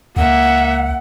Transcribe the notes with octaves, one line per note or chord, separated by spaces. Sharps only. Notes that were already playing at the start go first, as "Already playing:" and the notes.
C#2 A#3 E5 F#5